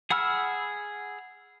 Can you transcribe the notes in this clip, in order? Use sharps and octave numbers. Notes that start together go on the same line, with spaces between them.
G#4 F#5 B5 E6 F6